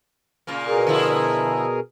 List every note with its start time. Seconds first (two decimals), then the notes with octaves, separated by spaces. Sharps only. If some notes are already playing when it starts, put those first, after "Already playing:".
0.47 A#2 C#3 A#3
0.67 B2 G#4 A#4
0.86 D3 F3 E4